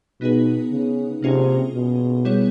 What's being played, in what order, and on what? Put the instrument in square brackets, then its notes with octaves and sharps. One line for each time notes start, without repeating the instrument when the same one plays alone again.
[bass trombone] B2 [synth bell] B3 D#4 G#4 B4
[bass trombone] C#3
[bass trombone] C3 [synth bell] A#3 C#4 F4 G#4
[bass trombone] B2
[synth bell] G3 B3 E4 G#4 C#5